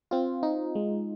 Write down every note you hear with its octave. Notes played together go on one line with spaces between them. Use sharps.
C4 F4
D#4
G#3